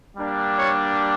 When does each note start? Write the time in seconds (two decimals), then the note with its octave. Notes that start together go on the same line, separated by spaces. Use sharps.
0.17 G3 A#3 D4 G4
0.57 C#5